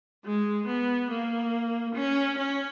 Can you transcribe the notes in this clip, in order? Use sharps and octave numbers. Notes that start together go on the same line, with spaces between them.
G#3
B3
A#3
C#4
C#4